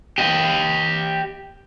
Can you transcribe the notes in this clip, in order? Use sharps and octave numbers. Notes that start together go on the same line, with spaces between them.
G4 D#5